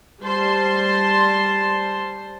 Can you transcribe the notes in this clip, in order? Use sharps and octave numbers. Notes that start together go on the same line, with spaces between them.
G3 C5 A5 C6